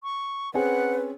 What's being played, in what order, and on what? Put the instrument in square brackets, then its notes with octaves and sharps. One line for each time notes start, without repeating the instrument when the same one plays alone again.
[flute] C#6
[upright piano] C4 C#4 G#4 [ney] B4 [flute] F#5